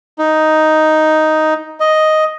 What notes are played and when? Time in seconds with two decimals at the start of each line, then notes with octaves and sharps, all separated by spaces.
0.19 D#4
1.80 D#5